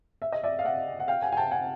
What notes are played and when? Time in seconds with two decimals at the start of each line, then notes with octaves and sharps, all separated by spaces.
0.22 E5
0.32 D#5
0.44 D5 E5
0.59 F5
0.64 E5 F#5
1.00 F#5
1.08 F5 G5
1.22 F#5 G#5
1.32 G#5
1.37 G5 A5
1.51 F#5 G#5